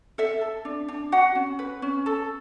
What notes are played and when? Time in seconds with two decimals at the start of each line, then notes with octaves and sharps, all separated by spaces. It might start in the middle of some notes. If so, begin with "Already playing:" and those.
0.18 A4 E5
0.41 A4
0.65 D4
0.88 D4
1.12 F#4 F#5
1.35 C#4
1.59 B4
1.82 C#4
2.06 A4